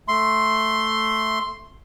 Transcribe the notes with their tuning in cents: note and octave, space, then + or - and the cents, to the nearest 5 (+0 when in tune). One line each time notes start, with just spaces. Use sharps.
A3 +0 E5 +0 C6 +0